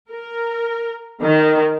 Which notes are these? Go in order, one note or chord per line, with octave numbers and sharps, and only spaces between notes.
A#4
D#3